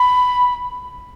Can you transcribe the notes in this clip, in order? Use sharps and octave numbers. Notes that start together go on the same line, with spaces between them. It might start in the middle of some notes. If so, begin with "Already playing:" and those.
Already playing: B5